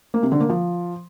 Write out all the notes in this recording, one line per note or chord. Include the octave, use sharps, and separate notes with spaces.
A#3
C3
D3
A#3
F3